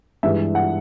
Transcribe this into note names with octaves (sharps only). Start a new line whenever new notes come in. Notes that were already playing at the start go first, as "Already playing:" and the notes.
G2 E3 G#3 E5
F#5